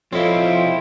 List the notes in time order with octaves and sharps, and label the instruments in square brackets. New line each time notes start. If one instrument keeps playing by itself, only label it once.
[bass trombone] F3 [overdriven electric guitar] C4 E4 [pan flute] A4 [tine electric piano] C#5 D#5 F5